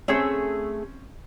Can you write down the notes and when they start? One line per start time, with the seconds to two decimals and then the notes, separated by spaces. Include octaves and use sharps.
0.08 A3 C4 C#4 G#4 E6